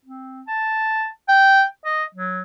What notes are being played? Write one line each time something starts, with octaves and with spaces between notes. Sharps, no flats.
C4
A5
G5
D#5
F#3